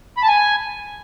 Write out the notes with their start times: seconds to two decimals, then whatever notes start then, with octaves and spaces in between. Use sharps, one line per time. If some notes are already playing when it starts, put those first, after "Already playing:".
0.17 B5
0.23 A5
0.28 G#5